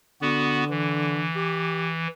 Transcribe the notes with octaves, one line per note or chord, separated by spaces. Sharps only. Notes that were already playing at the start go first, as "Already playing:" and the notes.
D3 B3 F#4
E3
G4